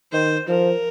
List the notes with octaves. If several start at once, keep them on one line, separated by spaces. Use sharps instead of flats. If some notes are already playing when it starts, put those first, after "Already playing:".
D#3 C5
F3 A#4